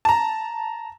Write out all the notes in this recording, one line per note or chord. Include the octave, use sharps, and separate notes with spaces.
A5 A#5